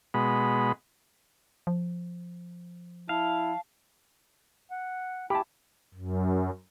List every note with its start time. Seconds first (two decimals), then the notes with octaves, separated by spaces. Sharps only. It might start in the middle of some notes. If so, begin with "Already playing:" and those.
0.14 B2 G#3 B5
1.67 F3
3.09 E4 F5 A5
4.71 F#5
5.30 E4 G4 G#5 A5 B5
5.94 F#2